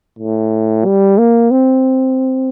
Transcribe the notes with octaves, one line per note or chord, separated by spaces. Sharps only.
A2
G3
A#3
C4